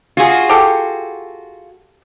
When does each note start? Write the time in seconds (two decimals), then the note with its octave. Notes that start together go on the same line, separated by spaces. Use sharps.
0.17 F4 F#4 G#4
0.49 G4 A4